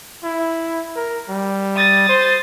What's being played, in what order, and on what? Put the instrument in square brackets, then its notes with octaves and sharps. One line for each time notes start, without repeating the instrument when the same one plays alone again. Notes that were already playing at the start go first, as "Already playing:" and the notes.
[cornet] E4
A#4
G3
[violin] D#6 A6
[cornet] C5